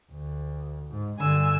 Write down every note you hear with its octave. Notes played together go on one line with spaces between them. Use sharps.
D2
G#2
G2 D3 G#5 E6